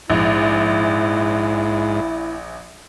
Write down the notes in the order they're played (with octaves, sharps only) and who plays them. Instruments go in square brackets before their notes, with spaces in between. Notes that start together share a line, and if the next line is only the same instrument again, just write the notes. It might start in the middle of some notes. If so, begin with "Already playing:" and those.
[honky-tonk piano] A#1 [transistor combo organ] G#2 [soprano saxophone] E4